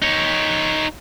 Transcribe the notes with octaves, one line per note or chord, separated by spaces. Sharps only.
D#4 C#5